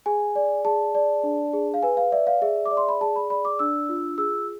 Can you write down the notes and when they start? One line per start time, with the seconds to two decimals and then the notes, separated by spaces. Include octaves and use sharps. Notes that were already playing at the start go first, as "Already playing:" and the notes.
0.06 G#4 G#5
0.36 D5
0.65 G#4 A5
0.95 D5
1.23 D4
1.53 G#4
1.74 F5
1.83 B4 G#5
1.97 F5
2.12 D5 E5
2.27 F5
2.42 G#4 E5
2.65 D6
2.71 D5
2.77 C6
2.89 B5
3.01 G#4 A5
3.16 B5
3.30 D5 B5
3.45 D6
3.59 D4 E6
3.89 F4
4.18 G#4 E6